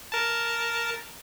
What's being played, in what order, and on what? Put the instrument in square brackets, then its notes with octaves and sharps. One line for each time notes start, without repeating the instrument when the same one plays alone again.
[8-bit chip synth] A#4 A5